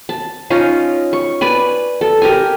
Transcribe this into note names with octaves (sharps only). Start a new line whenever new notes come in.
A5
C#4 D#4 F4
C#6
B4 D5 G#5
A4
G4 A#4 G#5